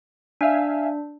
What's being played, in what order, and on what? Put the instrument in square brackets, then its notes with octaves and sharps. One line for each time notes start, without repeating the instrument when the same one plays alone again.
[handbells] D4 [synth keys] E5 F5 G#5